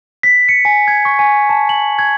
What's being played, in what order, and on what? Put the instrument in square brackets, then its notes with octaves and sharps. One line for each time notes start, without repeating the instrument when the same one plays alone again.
[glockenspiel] B6
C#7
G#5
G#6
C#6
G#5
A5
F#7
G#6